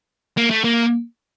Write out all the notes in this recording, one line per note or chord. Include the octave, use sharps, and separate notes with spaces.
A#3
A3
A#3